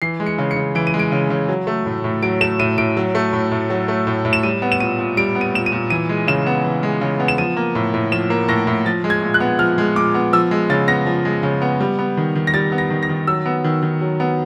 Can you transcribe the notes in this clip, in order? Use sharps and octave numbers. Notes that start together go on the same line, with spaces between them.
E3 C7
G#3
C#7
C#3
C#7
C#3
E3 D7
D#7
G#3
D7
C#3
C#3
F#3
A3
A2
A2
F#3 D7
A3 E7
A2 D#7
A2 D7
F#3
A3
A2
A2
F#3
A3
A2
A2
E7
G3 D#7
B3
E7
A#2 D#7
A#2
G3 D7
B3
D#7
A#2 E7
D#7
A#2
E3 D#7
G#3
C#3 E7
B3
E3
G#3
C#3
B3
E7
F3 D#7
A#3
A2
A2
F3 E7
A#3
A2 A#6
A2
F3 A6
G#3
G#6
A#2
F#6
B3
F3 F6
G#3
A#2 D6
B3
F3 E6
G#3
C#3 A6
B3 A#6
F3
G#3
C#3
B3
G3
B3
D#3
D#3
A#6
G3 A6
B3
A#6
D#3
A#6
D#3
F#3 E6
B3
D#3
D#3
F#3
B3